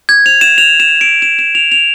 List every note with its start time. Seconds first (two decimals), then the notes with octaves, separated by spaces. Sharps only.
0.09 G#6
0.26 F7
0.41 E7
0.58 F7
0.80 E7
1.01 D7
1.22 E7
1.39 E7
1.55 F7
1.72 F7